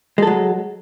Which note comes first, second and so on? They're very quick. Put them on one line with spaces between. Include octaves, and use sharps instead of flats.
G#3 A4 F#3